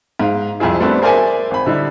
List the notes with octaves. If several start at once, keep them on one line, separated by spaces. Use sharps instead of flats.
G#2 F5
C2 F2 C4 E4 G#4
G3 A3 B3 C4 D4 F#4
G#4 A#4 C5 D5 E5 G#5
G#1 B5
D3 G3 D#4 E4